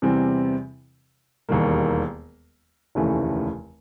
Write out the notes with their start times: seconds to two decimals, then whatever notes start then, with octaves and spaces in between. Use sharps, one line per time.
0.02 E2 C3 E3 G3 C4
1.49 E1 D#2 D#3 G3 A#3
2.95 F1 D#2 C#3 E3 A3